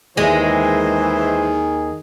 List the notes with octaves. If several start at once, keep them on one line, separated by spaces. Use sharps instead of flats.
D#2 D#3 E3 G#3 G#4 C5 E5